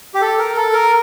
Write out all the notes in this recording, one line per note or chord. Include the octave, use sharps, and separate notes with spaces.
G4
A4
A#4
A4
A#4